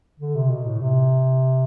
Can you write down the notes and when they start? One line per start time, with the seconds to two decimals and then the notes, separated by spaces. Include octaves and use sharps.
0.20 D3
0.35 C3
0.50 B2
0.66 A2
0.82 C3